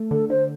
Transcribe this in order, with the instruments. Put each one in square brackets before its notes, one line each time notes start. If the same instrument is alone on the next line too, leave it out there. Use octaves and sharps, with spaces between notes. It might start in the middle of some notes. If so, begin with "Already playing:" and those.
Already playing: [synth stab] A3
[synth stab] D3 [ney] A4
[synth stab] D3 [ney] C5